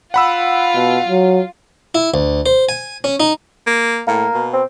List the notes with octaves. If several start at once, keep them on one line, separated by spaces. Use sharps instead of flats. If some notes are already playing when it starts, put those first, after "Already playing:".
F4 F#5 B5 E6
B2
F#3
E4
D2
C5
G#5
C#4
D#4
A#3
A2 A#3
B2
C4